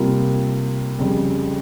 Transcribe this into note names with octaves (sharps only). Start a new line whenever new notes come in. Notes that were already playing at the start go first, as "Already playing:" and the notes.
Already playing: C3 G3 A#3 F4
F2 C#3 G3